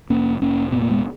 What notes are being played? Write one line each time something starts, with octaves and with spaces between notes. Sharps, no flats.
F1 A#3 C#4
F1 A#3 C#4
A#2 B3
A#3
G#3 B3